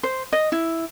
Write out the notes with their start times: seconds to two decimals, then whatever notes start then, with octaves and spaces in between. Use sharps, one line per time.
0.03 C5
0.33 D#5
0.52 E4